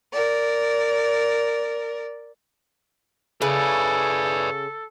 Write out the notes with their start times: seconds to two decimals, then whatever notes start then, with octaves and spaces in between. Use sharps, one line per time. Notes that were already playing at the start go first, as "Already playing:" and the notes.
0.13 A#4 D5
3.42 C#3 E4 G#4 A4 B4 C#5 D5